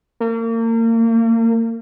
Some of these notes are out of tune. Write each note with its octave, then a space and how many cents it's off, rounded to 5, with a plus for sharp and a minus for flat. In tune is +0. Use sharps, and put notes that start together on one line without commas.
A#3 -35